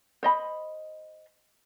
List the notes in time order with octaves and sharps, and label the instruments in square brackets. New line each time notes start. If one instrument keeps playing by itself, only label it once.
[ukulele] C5 D#5 B5